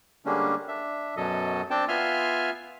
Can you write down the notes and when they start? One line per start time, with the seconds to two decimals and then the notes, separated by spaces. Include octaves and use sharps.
0.26 D3 G3 G#3 A#3 C#4 D4
0.68 D4 E5
1.17 F#2 B2 F#3 A4 D#5
1.70 C4 D4 G5 A5
1.88 B3 F4 E5 G#5 C6 F6